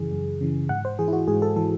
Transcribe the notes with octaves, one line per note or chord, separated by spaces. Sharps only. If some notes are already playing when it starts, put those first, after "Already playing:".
Already playing: F#2 C#3 E3 G#4
F#2
C#3 E3
G#2 F#5
C5
E3 G#4
E4
F#4
G#2 G#4
A4
E3 A4